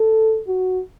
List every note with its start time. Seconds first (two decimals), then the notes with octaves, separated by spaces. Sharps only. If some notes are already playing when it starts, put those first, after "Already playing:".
Already playing: A4
0.48 F#4